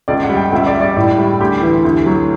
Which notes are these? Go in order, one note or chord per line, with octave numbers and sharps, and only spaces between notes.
C#2 D5
F#5
G3
G5
C#2 E5
D5
G3
D5
A2
G3
D2 G4
E3
D2
F#3